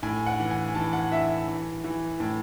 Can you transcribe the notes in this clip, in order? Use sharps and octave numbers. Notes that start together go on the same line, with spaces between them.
A2 G#5
F#5
E3
G#5
E3 A5
F#5
E3 E5
E3
E3
A2